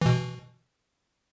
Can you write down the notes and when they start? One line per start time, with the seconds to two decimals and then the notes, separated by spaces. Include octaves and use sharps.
0.01 B2 E3